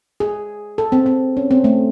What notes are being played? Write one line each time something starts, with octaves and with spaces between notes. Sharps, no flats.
G#4
A4
C4
C4
C#4
C4
A3